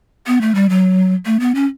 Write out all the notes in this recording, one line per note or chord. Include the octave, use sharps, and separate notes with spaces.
B3
A3
G3
F#3
A3
B3
C#4